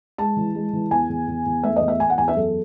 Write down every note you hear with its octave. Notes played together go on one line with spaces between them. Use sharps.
G#3 A5
E3
G#3
E3
E2 G#5
E2
E2
E2
A3 E5
D#5
E2
E5
E2 G#5
F#5
E2 G#5
E5
F#2 A4